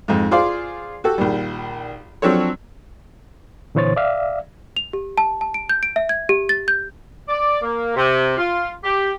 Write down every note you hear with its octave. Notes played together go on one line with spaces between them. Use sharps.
F2 G#2
F4 G#4 C5 D5 F5
F#4 G4 A4
A#1 D#3 G3
F3 F#3 C4 D4 A4 C#5
A#2 D3 E3 C5 C#5 A6
D5 E5 F5
F7
G4
A5
A5
D7
G6
D7
E5
G#6
G4
A6
G6
D5
A#3
C3
F4
G4